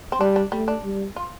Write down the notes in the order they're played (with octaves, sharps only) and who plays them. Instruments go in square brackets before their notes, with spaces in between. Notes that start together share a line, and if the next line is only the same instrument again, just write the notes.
[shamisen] C4
[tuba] G3 [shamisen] D4
[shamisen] D4
[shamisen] G3 [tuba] A3
[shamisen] D4
[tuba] G3
[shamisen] F4